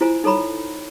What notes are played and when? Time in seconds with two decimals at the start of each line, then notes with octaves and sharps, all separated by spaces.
0.01 E4 F4 C5 G#5 A#5
0.24 D#4 A4 C#5 A#5 B5